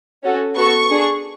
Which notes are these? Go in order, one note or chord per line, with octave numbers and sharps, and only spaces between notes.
C#4 F#4 A4
B3 F#4 A4 C#6
D4 G#4